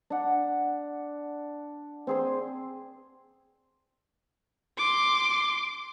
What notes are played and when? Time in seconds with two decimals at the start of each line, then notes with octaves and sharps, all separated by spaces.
0.10 D4 F#5
2.07 C4 G#4 C5
4.78 C6 D6